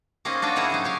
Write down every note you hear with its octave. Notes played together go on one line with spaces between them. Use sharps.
A#3 C4 C#4 D#4 G#4 D#5
D4 F4 F#4 G5
A#3 D#4 E4 G#4 F#5 A#5
C#3 F#3 D#4
G4 C#5 F5